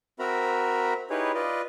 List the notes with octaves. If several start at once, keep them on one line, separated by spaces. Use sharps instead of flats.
C4 F#4 A#4 E5 A#5 B5
D#4 E4 G4 G#4 B4 C#5
F4 B4 D5 D#5